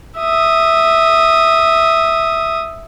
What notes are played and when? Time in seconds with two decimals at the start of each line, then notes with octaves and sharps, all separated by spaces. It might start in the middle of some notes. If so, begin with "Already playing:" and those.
0.20 E5 D#6